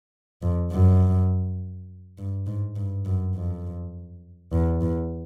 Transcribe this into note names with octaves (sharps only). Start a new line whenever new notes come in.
F2
F#2
G2
G#2
G2
F#2
F2
E2
E2